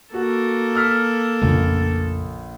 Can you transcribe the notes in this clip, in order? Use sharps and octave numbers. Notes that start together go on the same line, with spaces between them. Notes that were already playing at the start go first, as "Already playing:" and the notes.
A#3 F#4 A4
E6 F6 B6
A#1 F2 C#3 A3